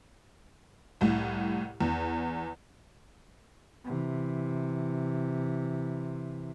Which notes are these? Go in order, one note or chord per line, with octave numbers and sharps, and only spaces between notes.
C2 A2
E2
C3 E3